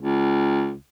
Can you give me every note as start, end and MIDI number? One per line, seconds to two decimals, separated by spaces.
0.01 0.73 37